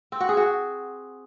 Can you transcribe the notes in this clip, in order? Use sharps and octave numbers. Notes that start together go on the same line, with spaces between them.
C4
F#4
G#4
F#4